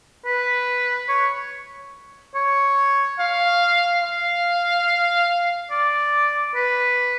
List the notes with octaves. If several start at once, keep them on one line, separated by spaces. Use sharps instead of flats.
B4
C#5
C#5
F5
F5
D5
B4